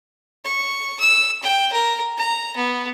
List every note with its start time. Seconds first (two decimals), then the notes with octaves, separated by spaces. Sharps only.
0.45 C#6
1.00 E6
1.43 G5
1.72 A#4
2.18 A#5
2.56 B3